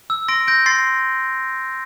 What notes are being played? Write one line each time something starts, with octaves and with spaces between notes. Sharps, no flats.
E6
C6 A#6 D7
G6 A#6 D7
C6 A6 C7